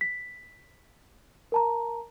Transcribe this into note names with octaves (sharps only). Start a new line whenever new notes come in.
B6
A#4 A5 A#5